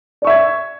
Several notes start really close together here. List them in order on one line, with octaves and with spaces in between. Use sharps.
D5 C#6 E5 G#6